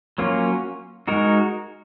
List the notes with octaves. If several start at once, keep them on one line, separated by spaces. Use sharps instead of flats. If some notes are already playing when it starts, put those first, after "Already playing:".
F#3 A#3 C#4 F4
G#3 D#4 F#4 A#4